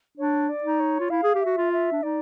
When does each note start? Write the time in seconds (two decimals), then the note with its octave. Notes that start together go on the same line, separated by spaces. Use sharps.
0.17 D4 C#5
0.49 D5
0.63 D#4
0.80 C#5
1.00 F4
1.10 E4 F5
1.23 G#4
1.35 G4
1.41 F#4 E5
1.57 F4
1.73 E5
1.92 D4
2.03 D#4 D5